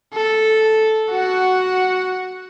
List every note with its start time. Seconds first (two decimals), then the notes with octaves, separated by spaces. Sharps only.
0.14 A4
1.11 F#4 F#5